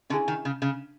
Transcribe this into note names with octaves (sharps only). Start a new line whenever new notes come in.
D3 C#4 E4 G#4
D#3
C#3
C#3